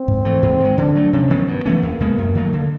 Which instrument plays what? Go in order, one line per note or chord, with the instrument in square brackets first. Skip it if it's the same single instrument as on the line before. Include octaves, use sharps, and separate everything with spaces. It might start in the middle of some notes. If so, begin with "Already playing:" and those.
Already playing: [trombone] C4
[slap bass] G#2
E3 A3
G#2
D#3 G#3
[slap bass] D3 [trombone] D4
[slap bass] F#3 A3
[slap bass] C3 [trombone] C#4
[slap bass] D#3 F#3 B3
[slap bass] G2 [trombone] B3
[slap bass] E3 A3 C#4
[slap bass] E2 [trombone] A#3
[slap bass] B2 G#3 B3
F#2
D#3 F#3 A3
D3